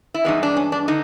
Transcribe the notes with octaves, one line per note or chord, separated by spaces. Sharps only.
E4
G2 E3 G#3 B3 D#4
D4
C#4
D4
D3 D#4